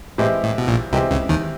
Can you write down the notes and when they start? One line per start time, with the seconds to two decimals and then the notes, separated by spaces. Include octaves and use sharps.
0.18 A2 E3 G#3 C4 E4 G4
0.43 A2
0.58 B2
0.68 A#1 A#2
0.92 C2 C3 E3 G#3 C4 E4 G4
1.11 C#2 C#3
1.29 D#2 D#3